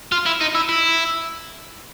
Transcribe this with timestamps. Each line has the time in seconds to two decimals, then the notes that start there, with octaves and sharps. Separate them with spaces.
0.12 F4
0.26 E4
0.41 D#4
0.55 E4
0.69 E4